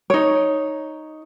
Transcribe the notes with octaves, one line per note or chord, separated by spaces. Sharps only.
D#4 C#5